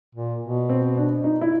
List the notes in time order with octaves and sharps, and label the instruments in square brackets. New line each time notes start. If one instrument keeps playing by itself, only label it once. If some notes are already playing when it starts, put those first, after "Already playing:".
[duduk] A#2
B2
[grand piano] C4
D4
D#4
E4